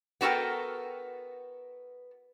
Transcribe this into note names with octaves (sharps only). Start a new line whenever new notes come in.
B3 F#4 A4 A#4 G5